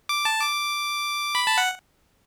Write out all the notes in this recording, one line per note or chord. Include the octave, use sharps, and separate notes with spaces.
D6
A5
D6
B5
A5
F#5